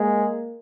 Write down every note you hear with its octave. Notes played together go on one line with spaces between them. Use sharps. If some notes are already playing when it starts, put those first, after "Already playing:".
Already playing: G#3 A#3